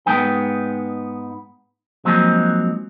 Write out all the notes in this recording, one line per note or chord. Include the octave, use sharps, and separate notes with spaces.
G#2 G#3 B3 D#4 G5
F3 F#3 G#3 A#3 C4 D#4